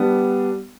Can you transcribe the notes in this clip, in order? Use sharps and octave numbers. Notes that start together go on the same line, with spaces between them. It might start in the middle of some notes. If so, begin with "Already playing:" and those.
Already playing: G3 B3 D4